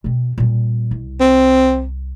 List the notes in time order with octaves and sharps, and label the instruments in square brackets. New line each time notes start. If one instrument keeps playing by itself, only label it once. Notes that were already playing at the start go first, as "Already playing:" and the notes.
[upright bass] B2 C4
A#2 G3
C2
[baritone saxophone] C4